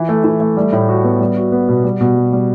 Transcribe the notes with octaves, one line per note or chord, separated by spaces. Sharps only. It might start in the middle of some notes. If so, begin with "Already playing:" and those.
Already playing: E3
A3
E3
A3
G3
A2
F#4
B3
G3
F#4
B3
B2
G3
B2
G3
G3